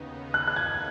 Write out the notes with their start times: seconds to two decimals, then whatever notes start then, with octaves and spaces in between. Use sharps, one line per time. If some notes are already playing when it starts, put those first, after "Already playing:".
Already playing: D#2 C#3 B3 D#4
0.34 F#6
0.47 F#6
0.56 G#6